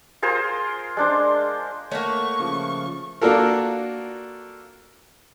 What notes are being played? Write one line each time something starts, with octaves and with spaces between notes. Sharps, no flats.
F4 G#4 A#4 C5
G#3 D4 C5
A3 A#3 C#5 E5 F#5 C#6
C#3 F3
A#3 D4 F4 F#4 A4 A#4